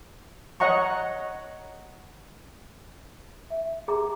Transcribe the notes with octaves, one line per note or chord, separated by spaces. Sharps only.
C#5 D#5 F#5 A#5 C#6
E5
G#4 A#5